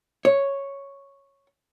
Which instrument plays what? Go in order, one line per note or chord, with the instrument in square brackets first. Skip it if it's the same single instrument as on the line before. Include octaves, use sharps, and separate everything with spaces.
[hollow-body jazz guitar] C#5